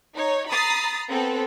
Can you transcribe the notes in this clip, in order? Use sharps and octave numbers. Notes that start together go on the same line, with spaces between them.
D#4 C#5
A#5 B5 D#6 A6 C7
B3 C4 A4